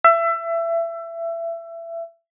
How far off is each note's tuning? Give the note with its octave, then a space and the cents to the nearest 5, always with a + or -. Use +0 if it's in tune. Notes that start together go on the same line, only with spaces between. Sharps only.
E5 +25